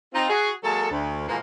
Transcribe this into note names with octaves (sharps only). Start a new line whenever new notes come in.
C4 D#4 F4
F#4 G#4
F#3 G#3 A#3 A4
D2
G#2 B2 E3 F3 G#3 A#3